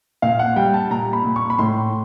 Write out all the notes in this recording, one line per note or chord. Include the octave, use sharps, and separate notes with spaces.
A#2 F5
F#5
G3 G5
A5
A#2 A#5
B5
A#2
C#6
B5
A2 C6